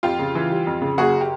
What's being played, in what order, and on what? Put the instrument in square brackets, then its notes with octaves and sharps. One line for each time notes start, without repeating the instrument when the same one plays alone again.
[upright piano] F2 F4 G4
C#3
E3
G3
F2
C#3
F#1 F#4 G#4
G4